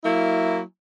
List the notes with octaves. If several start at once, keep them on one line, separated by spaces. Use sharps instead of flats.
F#3 A#3 E4